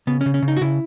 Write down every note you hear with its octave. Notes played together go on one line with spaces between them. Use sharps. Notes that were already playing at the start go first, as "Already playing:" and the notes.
C#3 B3
C#4
C#3
C#4
C#3
D#4
F#4
C#3 E4